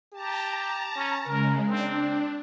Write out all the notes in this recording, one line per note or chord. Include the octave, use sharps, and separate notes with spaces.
G4 A5 A#5
C#4
C#3 G#3 A#4
C4 D4